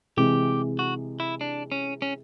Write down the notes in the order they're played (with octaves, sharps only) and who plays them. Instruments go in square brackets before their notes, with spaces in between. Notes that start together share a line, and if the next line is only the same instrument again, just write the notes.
[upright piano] C3 E3 G#3 [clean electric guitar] G4
[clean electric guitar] F#4
E4
D4
C#4
C#4